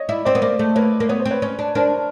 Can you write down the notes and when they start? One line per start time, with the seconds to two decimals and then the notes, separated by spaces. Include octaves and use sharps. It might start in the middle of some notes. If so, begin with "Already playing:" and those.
Already playing: C#5 D#5
0.09 E4 D5 E5
0.25 C4 C5 D5
0.35 B3
0.42 A#3 C5 D5
0.59 A3
0.76 A#3 B4 C#5
1.00 A#3
1.09 B3 C#5
1.20 C5
1.26 C4
1.31 B4 C#5
1.42 C#4
1.59 D4
1.75 D4 A#4 C5